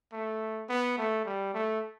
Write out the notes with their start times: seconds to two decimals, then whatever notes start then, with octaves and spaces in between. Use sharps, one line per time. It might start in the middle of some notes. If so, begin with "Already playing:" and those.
0.12 A3
0.69 B3
0.97 A3
1.25 G3
1.54 A3